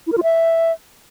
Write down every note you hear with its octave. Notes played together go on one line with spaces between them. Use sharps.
E4
A#4
F4
E5